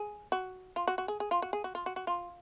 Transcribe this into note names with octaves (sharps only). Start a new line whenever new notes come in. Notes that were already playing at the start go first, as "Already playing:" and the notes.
Already playing: G#4
F#4
F4
F#4
F#4
G#4
G#4
F4
F#4
G#4
F#4
F4
F#4
F#4
F4